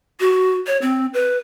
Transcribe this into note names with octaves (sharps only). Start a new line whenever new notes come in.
F#4
C#5
C4
B4